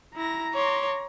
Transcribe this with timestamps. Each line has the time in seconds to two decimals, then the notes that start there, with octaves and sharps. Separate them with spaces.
0.16 E4 A#5 A#6
0.54 C#5 C6 D6